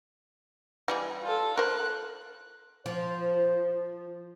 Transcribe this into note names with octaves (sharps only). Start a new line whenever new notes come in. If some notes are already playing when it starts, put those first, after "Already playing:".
E3 G3 G#4
F4 A4
A#4 C5 F#6
F3 C5